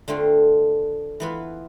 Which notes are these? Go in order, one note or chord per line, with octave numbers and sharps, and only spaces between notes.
D3 A3 C4 F4
E3 B3 F4 B4